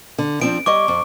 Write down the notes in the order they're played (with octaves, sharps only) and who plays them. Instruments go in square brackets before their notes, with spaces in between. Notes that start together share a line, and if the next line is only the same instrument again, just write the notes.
[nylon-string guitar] D3
[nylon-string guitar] F3 C4 D4 [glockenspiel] D7
[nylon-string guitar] G3 C#5 D#5 [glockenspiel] C#6 D6
[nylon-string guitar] F2